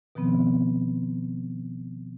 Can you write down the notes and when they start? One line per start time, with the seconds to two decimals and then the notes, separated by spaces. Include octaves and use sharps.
0.15 B2 D#3 F3 B3 C4